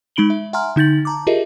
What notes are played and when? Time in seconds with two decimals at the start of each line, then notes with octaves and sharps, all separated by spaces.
0.16 G#3 D#4 B5 D7 F#7 G7
0.30 E5
0.53 E5 F#5 G#5 A#5 C6 F6
0.76 D3 D#4 G6 A6 F#7
1.05 A5 A#5 D6
1.27 F4 G4 G#4 A#4 D#5 E5